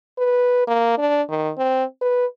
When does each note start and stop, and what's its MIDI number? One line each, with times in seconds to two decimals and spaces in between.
0.18 0.64 71
0.67 0.97 58
0.98 1.22 62
1.29 1.51 51
1.58 1.84 60
2.02 2.26 71